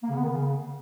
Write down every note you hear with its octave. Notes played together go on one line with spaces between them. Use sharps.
A#3
C#3
B3
D#3
C#3